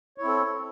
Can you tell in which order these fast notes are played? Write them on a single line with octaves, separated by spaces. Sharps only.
C#5 E4 C4 A4